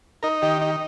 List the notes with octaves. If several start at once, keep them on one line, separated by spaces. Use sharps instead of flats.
D#4 A#4
D#3 G4
D#4